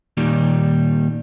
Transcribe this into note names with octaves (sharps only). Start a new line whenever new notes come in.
D#2 A#2 D#3 G3